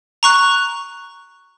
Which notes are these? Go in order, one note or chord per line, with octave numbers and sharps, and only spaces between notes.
A#5 C#6 F#6